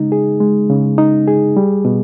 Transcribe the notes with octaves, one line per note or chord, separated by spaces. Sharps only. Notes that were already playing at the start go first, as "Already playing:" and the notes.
Already playing: C#3 G#3 D#4
G#4
G#3
C#3
D#4
G#4
G3
B2